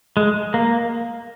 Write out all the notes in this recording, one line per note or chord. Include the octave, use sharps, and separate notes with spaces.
G#3
A#3